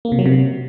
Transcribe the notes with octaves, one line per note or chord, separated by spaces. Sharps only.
A#3
C3
F#3
C3